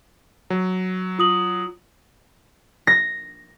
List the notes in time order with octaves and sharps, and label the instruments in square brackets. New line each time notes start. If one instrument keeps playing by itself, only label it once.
[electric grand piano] F#3
[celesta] F4 D#6 F#7
[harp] A#6